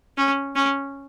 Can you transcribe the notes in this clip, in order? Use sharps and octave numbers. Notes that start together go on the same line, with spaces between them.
C#4
C#4